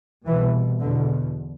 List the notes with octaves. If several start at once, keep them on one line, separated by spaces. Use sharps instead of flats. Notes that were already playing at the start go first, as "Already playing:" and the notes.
B2 E3
C2
E2 B2 D3